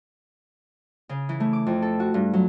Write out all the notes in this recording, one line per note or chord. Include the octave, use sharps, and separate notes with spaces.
C#3
E3
A3
D6
F2
A4
F#4
G2
F#3